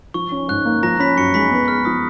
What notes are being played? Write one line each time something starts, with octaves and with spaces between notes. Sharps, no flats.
F3 C#6
C#4
G#2 F#6
A#3
F3 A#5 A#6
C#4 B5 B6
F#2 C#6 C#7
G#3 B5 B6
B3
G#4 F6
F3 D#6